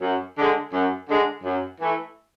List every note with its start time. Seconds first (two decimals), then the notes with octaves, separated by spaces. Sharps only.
0.01 F#2
0.37 D3 G#3
0.73 F#2
1.08 D3 G#3
1.44 F#2
1.81 E3 A3